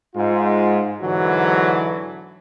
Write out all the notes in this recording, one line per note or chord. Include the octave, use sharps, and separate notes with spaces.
G#2 F4
G#2 D3 E3 F#3